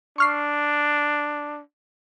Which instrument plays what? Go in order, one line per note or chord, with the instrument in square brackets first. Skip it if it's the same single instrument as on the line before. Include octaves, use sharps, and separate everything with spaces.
[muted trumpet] D4 [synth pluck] C#6 F6 C7